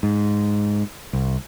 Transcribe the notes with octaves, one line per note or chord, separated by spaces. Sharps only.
G#2
C2